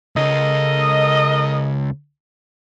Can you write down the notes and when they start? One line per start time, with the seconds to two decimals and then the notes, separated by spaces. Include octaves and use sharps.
0.16 C#2 C#3 A4 A#4 D#5